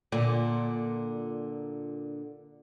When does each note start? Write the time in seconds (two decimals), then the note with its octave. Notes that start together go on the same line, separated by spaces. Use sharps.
0.12 A#2 D3